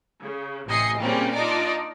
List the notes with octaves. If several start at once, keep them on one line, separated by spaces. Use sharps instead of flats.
C#3
A1 C3 D#5 G#5 C7 C#7
A#2 C#3 G3 A#3 C4 C#4
D4 D#4 F4 D5 D#5